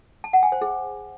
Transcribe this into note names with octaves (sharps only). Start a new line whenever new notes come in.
A5
F#5
G#5
C5
G#4